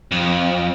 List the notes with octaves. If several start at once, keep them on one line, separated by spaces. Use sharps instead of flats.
F2